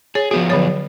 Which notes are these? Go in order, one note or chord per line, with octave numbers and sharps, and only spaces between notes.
G#4 C#5
F3 B3 F#4 G#4
D3 F#3 C#5